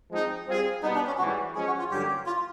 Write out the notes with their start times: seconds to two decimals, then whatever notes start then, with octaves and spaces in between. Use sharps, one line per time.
0.10 F3 G#3 C4 D#4
0.46 G3 C4 F4 G#4
0.82 B2 G3 B3 D#4
0.95 D4
1.07 C#4
1.18 G#2 E3 G3 F#4
1.54 F3 G#3 C#4 G#4
1.67 F#4
1.79 F4
1.91 G2 D3 F#3 A#3 C#4 G4
2.26 F4